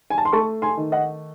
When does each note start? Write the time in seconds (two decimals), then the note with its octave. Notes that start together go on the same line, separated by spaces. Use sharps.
0.10 G#5
0.18 A5
0.25 C6
0.33 A3 A5 C#6
0.62 G#5 C6
0.77 D#3
0.92 D#5 F#5